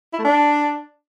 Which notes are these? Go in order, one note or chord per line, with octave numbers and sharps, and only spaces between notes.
E4
A3
D4